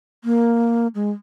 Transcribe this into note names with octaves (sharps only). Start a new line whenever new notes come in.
A#3
G#3